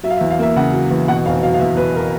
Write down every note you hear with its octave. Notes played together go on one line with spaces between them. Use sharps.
F#3 E5
F5
E5
E2
F5
A#3 E5
C#3 F#5
F#3
E2
B2 F#5
F1 F5
F#3 F5
F5
E2 E5
B2 B4
A#4